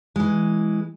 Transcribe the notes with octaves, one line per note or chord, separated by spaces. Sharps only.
E3 G#3